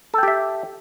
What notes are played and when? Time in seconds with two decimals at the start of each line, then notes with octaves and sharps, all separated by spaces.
0.14 A4
0.18 G5
0.23 G4
0.28 E5